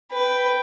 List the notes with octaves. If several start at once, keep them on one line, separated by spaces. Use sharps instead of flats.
B4 G5